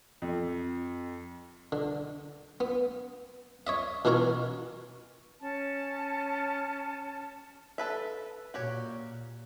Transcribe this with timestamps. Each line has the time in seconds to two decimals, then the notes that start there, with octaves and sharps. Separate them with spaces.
0.22 F2
1.72 D3
2.60 B3
3.67 C#5 D#5 E5
4.05 B2 E3 E4 A#4 C#5 A#5
5.41 C#4 A5
7.78 A4 B4 E5
8.54 A#2 F#4 G4 C#5